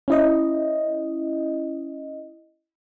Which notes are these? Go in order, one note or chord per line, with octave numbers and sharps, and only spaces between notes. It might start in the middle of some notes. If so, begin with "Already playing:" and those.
C#4 E4 D#5